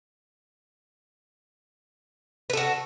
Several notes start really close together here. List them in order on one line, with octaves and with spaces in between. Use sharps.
B4 A4 F#4